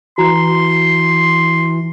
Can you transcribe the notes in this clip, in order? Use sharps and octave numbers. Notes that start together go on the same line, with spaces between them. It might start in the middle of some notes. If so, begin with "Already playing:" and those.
E3 F#4 A#5 C6